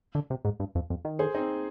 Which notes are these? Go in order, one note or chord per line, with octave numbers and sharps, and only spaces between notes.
D3
C3
G#2
G2
F2
F2
D#3
G#4 C5
C4 D#4